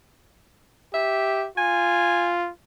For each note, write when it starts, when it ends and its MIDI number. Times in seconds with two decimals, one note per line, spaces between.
0.94 1.48 67
0.94 1.45 76
1.58 2.51 65
1.58 2.34 80